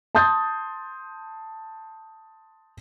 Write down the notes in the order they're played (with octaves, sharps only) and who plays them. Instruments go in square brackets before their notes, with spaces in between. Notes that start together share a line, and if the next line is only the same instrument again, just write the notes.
[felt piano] A5 C6 D#6 G6 A6